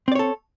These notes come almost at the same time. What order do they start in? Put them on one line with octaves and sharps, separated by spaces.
C4 D5 C#5 A4